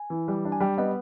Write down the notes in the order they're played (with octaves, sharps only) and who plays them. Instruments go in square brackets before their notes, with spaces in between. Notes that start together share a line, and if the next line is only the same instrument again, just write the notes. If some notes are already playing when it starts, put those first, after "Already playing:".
Already playing: [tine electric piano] G#5
[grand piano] E3
G3
D4
[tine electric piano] G#5
[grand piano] G3 [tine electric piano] G5
[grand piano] B3 [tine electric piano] D#5